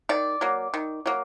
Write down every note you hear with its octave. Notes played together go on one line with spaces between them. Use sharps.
D#3 D5
F#3 A#3
D#3
F#3 A#3